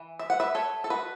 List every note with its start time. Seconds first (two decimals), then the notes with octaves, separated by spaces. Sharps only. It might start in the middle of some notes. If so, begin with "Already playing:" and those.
Already playing: E3
0.19 E5
0.30 F#5
0.40 B4 E5
0.55 A4 C#5
0.84 A4
0.90 F#4 B4